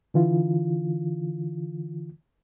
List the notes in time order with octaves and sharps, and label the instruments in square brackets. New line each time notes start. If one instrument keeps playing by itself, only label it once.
[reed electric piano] D3 E3 F4